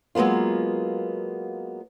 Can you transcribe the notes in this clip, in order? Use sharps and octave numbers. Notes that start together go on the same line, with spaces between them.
F#3 G#3 A#3 B3 F4